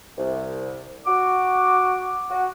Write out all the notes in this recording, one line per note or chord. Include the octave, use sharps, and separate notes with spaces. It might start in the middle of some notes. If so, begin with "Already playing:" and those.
C2
F#4 D6
F#4